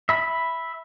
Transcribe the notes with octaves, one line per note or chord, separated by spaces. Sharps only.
E5 B5